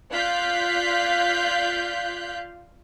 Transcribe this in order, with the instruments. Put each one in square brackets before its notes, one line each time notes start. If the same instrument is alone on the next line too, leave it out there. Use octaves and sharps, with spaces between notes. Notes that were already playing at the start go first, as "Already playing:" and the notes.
[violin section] F4 D5 F5 F#6 G6 B6